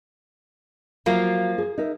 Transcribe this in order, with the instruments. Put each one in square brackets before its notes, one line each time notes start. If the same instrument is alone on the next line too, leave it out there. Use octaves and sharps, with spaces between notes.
[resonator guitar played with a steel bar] F3 A#3 F4 [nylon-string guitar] F#3
[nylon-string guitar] G#4
D#4 A#4 E5